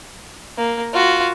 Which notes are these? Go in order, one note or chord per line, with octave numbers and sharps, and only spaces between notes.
A#3
F4 F#4